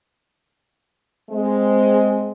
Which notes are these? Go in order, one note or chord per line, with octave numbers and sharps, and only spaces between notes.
G#3 C4